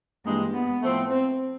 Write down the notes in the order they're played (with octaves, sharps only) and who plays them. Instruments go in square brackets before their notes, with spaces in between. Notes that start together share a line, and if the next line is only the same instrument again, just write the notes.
[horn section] G2 E3 G#3 [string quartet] A#3
[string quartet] B3
[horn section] A2 F3 A3 C4
[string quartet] C4